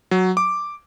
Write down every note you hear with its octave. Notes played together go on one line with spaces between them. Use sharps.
F#3
D6